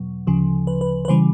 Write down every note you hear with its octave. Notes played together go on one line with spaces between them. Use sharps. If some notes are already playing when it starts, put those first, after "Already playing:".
Already playing: E2 B2 F#3
D2 C#3 F3
B4
B4
B4
C#3 E3 G3 C5